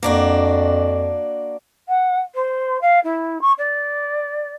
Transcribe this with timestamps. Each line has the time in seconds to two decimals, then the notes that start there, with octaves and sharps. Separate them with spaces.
0.03 F2 A#3 D4 F#4
1.88 F#5
2.34 C5
2.81 F5
3.04 E4
3.41 C#6
3.58 D5